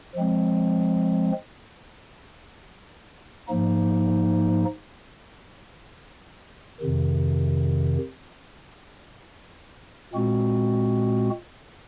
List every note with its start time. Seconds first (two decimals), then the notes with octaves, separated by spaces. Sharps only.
0.15 F3 G#3 C4
3.48 G#2 F3 A#3 D#4
6.81 F2 C3 D#3
10.13 A#2 G#3 C4 F#4